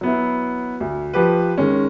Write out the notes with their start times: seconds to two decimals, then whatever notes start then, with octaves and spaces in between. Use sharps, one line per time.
0.01 F#3 B3 E4
0.80 D2
1.14 F3 G4 B4
1.58 D#3 G#3 C#4